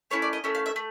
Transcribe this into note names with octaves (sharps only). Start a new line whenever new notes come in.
A3 C#4 E4 C#5
D5
D#5
A3 C#4 E4
F5
E5
A3